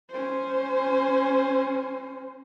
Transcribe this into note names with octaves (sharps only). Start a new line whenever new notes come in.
C#4 C5